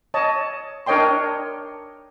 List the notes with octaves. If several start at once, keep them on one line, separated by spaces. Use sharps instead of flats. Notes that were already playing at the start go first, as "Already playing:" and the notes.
C#5 D#5 A5
D4 A#4 C#5 D#5 G5 C6